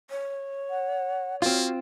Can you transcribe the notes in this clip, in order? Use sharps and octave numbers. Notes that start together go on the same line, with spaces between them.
C#5
F#5
A#3 C4 F4 F#4